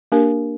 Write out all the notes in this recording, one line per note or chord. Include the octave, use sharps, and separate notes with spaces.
A#3 D4 G4 A#4